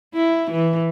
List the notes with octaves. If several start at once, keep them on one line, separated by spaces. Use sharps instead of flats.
E4
E3